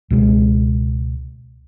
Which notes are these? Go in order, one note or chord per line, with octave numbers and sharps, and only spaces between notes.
C#2 B2 G#3